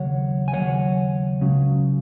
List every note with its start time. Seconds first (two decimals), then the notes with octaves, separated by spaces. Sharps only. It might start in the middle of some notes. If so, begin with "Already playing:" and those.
Already playing: D#2 C#3 F#3 C#5 F#5
0.48 G#5
0.53 D#2 C#3 F#3 C#5 F#5
1.41 C#2 C#3 F#3